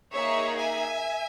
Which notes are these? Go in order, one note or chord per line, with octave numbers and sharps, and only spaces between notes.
A#3 D#4 G#4 C#5 E5
E5 G#5